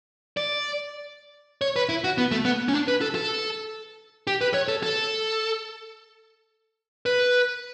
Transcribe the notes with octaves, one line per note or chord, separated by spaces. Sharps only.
D5
C#5
B4
E4
F#4
B3
A3
B3
C#4
D4
B4
A4
A4
G4
B4
C#5
A4
A4
B4